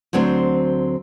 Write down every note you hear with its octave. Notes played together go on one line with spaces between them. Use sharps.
D2 F#3 C4 D4 C5